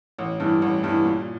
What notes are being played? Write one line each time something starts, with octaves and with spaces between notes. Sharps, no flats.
A1
G2 E3
A1
G2 E3
A#2